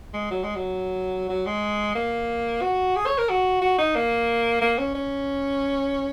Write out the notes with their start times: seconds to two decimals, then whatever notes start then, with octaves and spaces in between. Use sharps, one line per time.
0.13 G#3
0.31 F#3
0.43 G#3
0.55 F#3
1.29 F#3
1.46 G#3
1.95 A#3
2.62 F#4
2.96 G#4
3.06 C#5
3.18 A#4
3.29 F#4
3.62 F#4
3.78 D#4
3.95 A#3
4.61 A#3
4.78 C#4
4.95 C#4